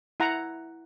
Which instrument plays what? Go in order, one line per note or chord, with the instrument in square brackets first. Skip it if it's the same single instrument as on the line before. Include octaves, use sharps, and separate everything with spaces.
[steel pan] E4 F#5 A#5